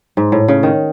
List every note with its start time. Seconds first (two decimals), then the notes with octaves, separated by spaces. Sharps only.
0.17 G#2
0.32 A2
0.48 C#3
0.63 D#3